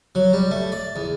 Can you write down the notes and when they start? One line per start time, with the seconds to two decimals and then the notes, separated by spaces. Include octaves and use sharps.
0.15 F#3
0.33 G3
0.51 A3
0.72 D5
0.96 E2